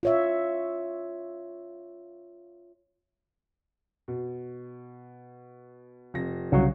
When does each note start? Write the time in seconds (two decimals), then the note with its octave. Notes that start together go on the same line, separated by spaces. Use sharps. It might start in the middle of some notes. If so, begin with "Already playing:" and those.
0.03 F4 C#5 E5
4.08 B2
6.14 F1 A#6
6.52 C2 C#3 F#3 F#4